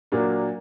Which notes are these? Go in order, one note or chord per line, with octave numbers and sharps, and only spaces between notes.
A#2 F#3 A#3 D4